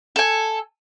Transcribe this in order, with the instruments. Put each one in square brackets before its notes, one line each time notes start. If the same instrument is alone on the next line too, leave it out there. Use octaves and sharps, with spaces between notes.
[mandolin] A4 G#5